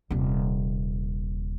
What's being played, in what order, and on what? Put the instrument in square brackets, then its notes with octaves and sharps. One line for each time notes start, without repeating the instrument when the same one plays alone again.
[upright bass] D#1 C3